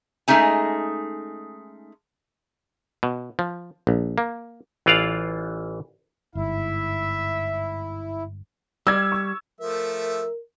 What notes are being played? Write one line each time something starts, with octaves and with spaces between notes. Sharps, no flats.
G#3 A3 C#4 D#4 G#5
B2
F3
A#1
A#3
A1 E3 F4 D5 F5
G1 G#2 E4 E5
G3 E6 G#6
C#6
F3 A3 A#4 E5